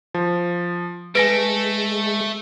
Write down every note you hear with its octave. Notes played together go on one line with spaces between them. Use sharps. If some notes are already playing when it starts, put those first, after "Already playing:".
F3
G#3 A3 B4 G#5 A#6 D7